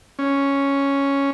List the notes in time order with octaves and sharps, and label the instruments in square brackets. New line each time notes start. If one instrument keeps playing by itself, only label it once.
[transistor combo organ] C#4